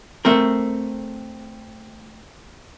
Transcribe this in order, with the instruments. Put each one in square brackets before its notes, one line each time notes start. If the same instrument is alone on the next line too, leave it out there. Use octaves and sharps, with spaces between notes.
[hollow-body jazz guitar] A3 C4 A#4